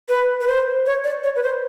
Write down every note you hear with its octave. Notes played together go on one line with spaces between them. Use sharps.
B4
B4
C5
C#5
D5
C#5
B4
C5